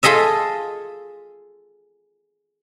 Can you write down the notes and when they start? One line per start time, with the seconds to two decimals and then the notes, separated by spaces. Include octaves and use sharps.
0.03 F4 G#4 A4 D#5 E5